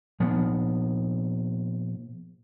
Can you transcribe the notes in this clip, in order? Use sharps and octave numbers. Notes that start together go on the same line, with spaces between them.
A#2 F3 B3